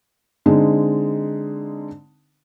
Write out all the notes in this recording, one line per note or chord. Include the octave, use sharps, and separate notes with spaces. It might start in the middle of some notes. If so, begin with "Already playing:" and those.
D3 G#3 C4 D#4